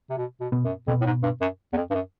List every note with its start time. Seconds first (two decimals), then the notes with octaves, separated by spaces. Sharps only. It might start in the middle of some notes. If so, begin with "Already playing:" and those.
0.10 C3
0.17 B2
0.41 B2
0.52 B2 B3
0.64 F#2
0.87 F2 B2 B3
1.01 A2
1.06 G#2
1.23 G2
1.41 F#2
1.73 E2
1.77 F2
1.90 G2
1.94 F#2